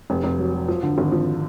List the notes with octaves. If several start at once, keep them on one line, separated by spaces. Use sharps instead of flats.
F1
F1
F#3
F#3
F3
D3
G#1
F3